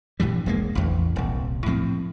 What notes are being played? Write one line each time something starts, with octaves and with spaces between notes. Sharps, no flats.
A#1 G2 E3 G3
E1 G#3 A#3
A1 E2
D#1 C2
A2 F3 C4